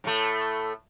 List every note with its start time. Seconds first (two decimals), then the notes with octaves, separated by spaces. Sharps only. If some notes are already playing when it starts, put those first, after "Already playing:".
0.04 A2 A3